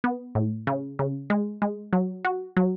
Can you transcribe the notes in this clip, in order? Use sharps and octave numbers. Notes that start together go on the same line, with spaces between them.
B3
A2
C#3
C#3
G#3
G#3
F#3
F#4
F#3